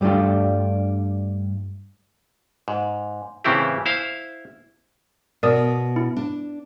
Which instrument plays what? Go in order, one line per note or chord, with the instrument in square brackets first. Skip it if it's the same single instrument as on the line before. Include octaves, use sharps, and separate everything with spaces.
[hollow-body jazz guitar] G2 G3 A3 D4 F4
[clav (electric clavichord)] G#2
A2 C#3 E3 C4 E4 G4
E4 C5 F5
[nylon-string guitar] B2 [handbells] A#4 D5 D#6
[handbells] E4
[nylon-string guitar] D4